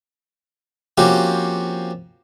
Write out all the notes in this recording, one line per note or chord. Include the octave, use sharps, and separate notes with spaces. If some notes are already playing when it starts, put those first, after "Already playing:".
F3 A#3 C4 C#4 F#4 G4